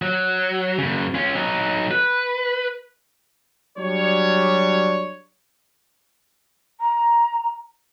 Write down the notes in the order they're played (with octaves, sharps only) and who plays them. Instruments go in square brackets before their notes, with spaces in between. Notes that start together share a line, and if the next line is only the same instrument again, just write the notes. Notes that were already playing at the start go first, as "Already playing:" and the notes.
[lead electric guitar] F#3
F#2 C#3
C#4 F4
F#3 D#4
B4
[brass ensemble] F#3 G3 D4 C#5
[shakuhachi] A#5